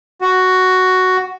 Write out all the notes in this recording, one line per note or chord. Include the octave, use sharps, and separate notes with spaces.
F#4